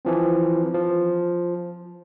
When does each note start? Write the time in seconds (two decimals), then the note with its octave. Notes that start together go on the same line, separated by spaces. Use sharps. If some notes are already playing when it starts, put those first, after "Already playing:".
0.05 E3 F3 C4
0.74 F3